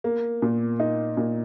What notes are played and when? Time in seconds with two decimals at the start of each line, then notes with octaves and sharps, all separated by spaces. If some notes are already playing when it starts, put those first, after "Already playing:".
0.04 A#3
0.42 A#2
0.80 D#4
1.17 A#2